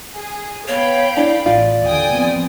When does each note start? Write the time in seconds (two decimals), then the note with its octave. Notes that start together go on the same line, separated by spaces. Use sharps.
0.15 G#4
0.68 B3 C#5 F5 G5 B5
1.17 D4 E4
1.46 A1 F4 D5
1.84 D#2 A#2 D3 G5 G#5 D#6
2.14 F3 B3 C4